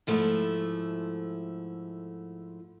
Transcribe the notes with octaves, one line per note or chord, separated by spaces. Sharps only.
G#2 F3 A3 E4